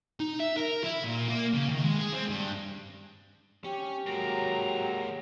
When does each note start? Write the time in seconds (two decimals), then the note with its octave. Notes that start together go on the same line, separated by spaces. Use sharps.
0.20 D#4
0.40 E5
0.57 A#4
0.84 E4
1.04 A#2
1.28 A#3
1.54 C#3
1.69 D#3
1.84 G#3
1.99 G#4
2.13 C4
2.29 G2
3.64 C#4 G4
4.06 F#3 G#3 A#3 A#5